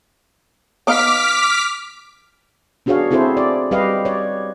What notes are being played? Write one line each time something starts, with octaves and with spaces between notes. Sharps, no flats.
B3 D#4 F5 D6 F6 B6
B3 D4 F#4 G#4 C#5 F5
C4 E4 G#4 A4 C5
D5
G3 G4 B4 D#5 F5
C#5 D5